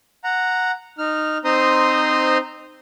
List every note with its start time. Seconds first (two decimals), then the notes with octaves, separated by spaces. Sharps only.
0.24 F#5 A#5
0.98 D#4 F6
1.45 C4 D#4 C5 A#5 C6 D#6